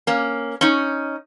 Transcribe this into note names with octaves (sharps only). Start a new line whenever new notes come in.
A#3 C#4
C#4 D#4